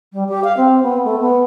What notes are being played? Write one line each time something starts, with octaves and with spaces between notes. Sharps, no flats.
G3
G4
F5
C4
B3
A3
B3